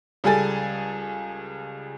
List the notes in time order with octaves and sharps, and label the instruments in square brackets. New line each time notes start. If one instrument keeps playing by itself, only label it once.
[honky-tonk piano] C#2 G3 G#4 A4 G#5 A6